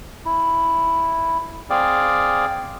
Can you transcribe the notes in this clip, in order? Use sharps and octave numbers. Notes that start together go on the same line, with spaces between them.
E4
C4 G#4 D5 F5